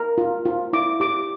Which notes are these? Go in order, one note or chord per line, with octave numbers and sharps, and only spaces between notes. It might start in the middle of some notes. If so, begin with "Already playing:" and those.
Already playing: A#4
F4
F4
E4 D6
G4 D6